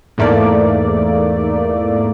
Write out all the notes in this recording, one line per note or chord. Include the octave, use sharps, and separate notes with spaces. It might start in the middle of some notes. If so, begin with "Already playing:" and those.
E2 G#2 A3 A#3 D5